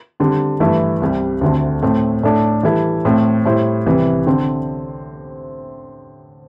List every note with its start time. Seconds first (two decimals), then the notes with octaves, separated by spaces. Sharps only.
0.20 D3 G3 C4
0.60 G2 E3 A3 E4
1.02 C2 C3 G3
1.41 D2 D3 A3 C4
1.82 A2 A3 C4
2.23 A2 A3 D4 A4
2.63 E3 G3 E4 A4
3.05 A2 A3 C4
3.45 A2 G3 E4 C5
3.86 C2 C3 E3 G3
4.27 D3 C4